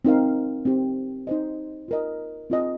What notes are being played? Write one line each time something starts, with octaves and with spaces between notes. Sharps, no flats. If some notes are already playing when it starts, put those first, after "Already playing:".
C4 D#4 A#4 F5
C4 G4 C5
D#4 C5 D#5
F4 A#4 D#5
C4 F4 D#5